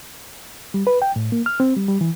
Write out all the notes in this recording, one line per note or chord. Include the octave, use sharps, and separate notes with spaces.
G3
B4
G5
A2
A#3
F6
C4
G3
G3
E3